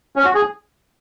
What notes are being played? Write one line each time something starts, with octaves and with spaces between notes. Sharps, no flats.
C#4
F#4
G#4